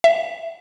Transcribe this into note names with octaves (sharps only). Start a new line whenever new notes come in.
E5